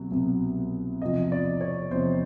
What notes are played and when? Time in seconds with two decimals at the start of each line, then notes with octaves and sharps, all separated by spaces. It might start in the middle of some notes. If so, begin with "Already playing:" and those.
Already playing: C2 B2 F#3
0.11 C2 B2 F#3
1.01 E2 C3 F3 D#5
1.32 D5
1.61 C#5
1.91 E2 C3 F3 C5